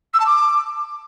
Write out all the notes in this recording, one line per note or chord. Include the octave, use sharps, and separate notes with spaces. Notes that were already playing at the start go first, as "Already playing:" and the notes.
E6
A5
D6